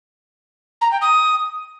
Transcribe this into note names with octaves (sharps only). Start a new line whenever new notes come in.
A#5
G5
D#6